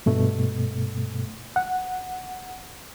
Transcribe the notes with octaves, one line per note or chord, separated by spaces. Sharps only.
G2 B2 A3
F#5